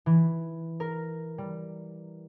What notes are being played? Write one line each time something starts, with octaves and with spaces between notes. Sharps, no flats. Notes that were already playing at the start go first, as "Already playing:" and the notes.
E3
A#4
G3